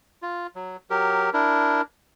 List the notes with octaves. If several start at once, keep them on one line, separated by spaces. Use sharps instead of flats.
F4
F#3
F#3 G4 A#4
D4 E4 A#4